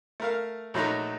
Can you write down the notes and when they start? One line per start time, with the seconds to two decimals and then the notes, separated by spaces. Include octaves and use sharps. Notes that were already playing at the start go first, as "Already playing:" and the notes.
0.20 A3 A#4 F5
0.74 A#1 F#3 A3 D#4 A#5